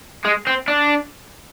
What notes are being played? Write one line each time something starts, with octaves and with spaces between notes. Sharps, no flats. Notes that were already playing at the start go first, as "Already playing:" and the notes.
G#3
C4
D4